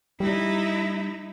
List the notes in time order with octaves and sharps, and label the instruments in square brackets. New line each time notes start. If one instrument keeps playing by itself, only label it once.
[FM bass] G3 [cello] D#4 E4